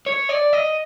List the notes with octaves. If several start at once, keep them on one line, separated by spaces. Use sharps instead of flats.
C#5
D5
D#5